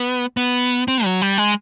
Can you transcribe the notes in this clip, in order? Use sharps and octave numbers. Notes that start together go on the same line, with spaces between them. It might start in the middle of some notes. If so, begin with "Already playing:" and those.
Already playing: B3
B3
C4
F#3
G3
G#3